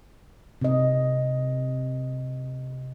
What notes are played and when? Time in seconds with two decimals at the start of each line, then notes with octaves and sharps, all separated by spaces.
0.62 C3 D#5